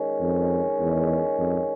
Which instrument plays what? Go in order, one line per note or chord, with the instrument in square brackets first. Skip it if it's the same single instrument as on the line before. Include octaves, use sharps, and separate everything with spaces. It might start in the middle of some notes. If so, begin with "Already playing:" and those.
Already playing: [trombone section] D#3 G#3 C#4
[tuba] F2
E2
F2